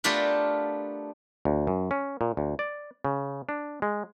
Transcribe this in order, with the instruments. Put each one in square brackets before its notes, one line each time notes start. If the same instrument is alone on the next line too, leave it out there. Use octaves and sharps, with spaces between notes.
[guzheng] A3 B3 D4 F4 G4 A#4
[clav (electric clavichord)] D2
F#2
C#4
A#2
D2
D5
C#3
D4
G#3